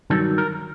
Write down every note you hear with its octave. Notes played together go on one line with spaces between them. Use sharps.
G2 D#3 F#3 A4
A#4